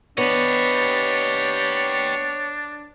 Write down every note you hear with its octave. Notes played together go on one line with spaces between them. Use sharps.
B3 D4 G4 C#5 D#5